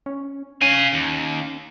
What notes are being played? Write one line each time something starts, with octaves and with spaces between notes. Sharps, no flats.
C#4
C#4 F5 G#5 D#7
D#2